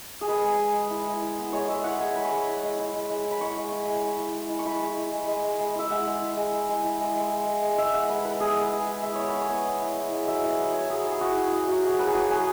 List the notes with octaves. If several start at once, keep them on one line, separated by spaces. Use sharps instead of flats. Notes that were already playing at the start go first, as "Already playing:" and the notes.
G#4
G#3 B4
G#3
G#3
G#3
E4
G#3
E4
B3
G#3 C#5
G#3 E5
E4 F#5
G#3 G#5
G#3 B5
C#6
G#3 B5
E4
G#3
E4
G#3
G#3
E4
B5
G#3 C#6
G#3
E4
G#3
E4
E4
G#3
E4
C#6
E4 B5
G#3
E4
G#3
G#3
G#3
G#3
E4 E5
G#3 F#5
G#3
E4
G#3
E4
G#3
E4
G#3
G#3
G#3
G#3
G#3
G#3 E5
G#3 F#5
G#3 B4
E4 B4
B3 G#4
G#3 B4
G#3
E4
G#3 E5
B3 C#5
B4
E4
C#5
B3
E4
E4
E4
G#3
F#3 E5
E4 F#5
F#3
E4 C#5
F#3 G#4
E4
G#4
E4 F#4
E4
E4 F#4
F#3 F#4
E4 G#4
F#3 B4
G#4
F#3 F#4
F#3 G#4